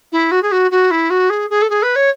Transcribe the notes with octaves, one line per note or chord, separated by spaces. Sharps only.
E4
F#4
G#4
F#4
F#4
E4
F#4
G#4
G#4
A4
G#4
B4
C#5